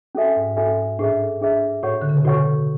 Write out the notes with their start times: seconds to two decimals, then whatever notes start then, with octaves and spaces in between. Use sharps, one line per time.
0.15 C#4 F#4 A4 E5 G#5
0.36 G#2
0.56 C#4 F#4 A4 E5 G#5
0.99 A2 D4 G#4 B4 E5
1.41 D4 G#4 B4 E5
1.83 A2 F#4 C#5 F#5 C#6
2.02 D3
2.09 C#3
2.17 B2
2.25 A2 F#4 C#5 F#5 C#6